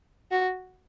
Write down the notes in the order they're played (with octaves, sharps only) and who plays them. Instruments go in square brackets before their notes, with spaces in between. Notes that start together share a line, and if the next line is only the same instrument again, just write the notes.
[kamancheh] F#4